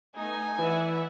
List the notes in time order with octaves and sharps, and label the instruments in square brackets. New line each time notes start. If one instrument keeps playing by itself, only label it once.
[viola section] A3 B3 D#4 [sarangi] G#5
[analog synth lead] E3 [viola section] D5 E5 F#5